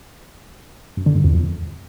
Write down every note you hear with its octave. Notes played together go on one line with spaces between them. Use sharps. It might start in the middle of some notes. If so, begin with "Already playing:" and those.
F#2
D3
G2
E2
F2